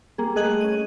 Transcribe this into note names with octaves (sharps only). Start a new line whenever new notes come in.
G3 A#3 G#4
A3 G#4 D#5 F#6 G#6 F#7
C#4 D#7